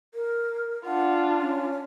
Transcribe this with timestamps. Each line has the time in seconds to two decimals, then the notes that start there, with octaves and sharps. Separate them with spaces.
0.14 A#4
0.86 D4 F4 F#5
1.39 C#4